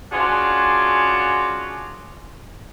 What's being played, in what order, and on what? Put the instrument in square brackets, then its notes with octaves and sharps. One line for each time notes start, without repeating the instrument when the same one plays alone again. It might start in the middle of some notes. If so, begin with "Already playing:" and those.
[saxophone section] C#4 D4 F4 F#4 G#4